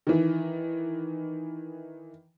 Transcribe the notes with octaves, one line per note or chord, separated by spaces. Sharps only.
D#3 E3